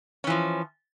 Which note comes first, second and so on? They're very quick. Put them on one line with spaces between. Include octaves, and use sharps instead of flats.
C#4 E3 F3